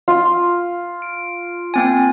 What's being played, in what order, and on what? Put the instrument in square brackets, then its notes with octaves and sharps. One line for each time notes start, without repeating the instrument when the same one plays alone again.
[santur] F4
[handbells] D7
A#3 C4 G#5